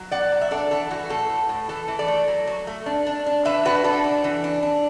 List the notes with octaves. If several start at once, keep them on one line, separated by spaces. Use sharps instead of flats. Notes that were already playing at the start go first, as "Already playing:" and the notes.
Already playing: F#3
B2 D5 F#5
F#3
E5
D4 A4 D5
E3 A4
E3 F#4
A2 A4
A2
A2
E3 A4
E3
A4 D5
A3
F#3
F#3
A3
D4
D4
D4
E3 B4 E5
D4 F#4 B4
D4 A4
D4
E3
D4
D4